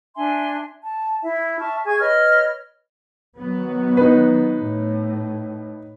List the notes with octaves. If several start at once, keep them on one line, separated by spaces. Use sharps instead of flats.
D4 E5 G#5 C6
A5
E4 E5
E5 A5 C#6 F6
G#4 G#5 C#6 G#6
B4 C#5 D#5 F6
D#3 F#3 B3
D#4 B4
A2